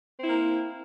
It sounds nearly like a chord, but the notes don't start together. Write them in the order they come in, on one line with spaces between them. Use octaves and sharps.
C4 E4 A#3